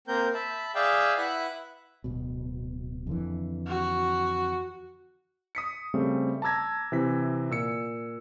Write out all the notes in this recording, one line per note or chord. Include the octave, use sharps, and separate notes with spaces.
A#3 C4 A#4 G6
E5 A5 B5
G#4 D5 E5 F5 G5
E4 B4 E5 F#5 B5 F#6
D1 B2
F2 D3 E3
F#4
D#6 B6 C#7
C#3 G3 A3 C4 C5
A5 A#5 D6 E6 G#6 A#6
C3 E3 B6
A#2 E6 C#7